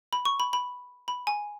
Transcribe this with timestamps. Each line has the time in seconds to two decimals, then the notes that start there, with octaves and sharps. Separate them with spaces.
0.13 B5
0.25 C#6
0.40 B5
0.53 B5
1.08 B5
1.27 G#5